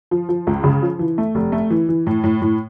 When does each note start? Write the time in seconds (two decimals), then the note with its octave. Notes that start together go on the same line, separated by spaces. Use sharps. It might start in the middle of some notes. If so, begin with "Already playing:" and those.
0.11 F3
0.29 F3
0.47 C#2
0.64 C#3
0.82 F3
0.99 E3
1.18 A3
1.35 F1
1.52 A3
1.70 E3
1.89 E3
2.07 A2
2.24 A2
2.42 A2